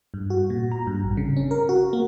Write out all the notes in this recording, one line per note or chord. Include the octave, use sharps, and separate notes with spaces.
G2
F#4
A#2
A#5
G2
A1
C#3
C#4
A#4
F#4
A#3